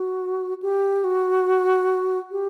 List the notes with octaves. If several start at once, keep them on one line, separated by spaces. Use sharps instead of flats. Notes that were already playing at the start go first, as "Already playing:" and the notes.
Already playing: F#4
G4
F#4
G4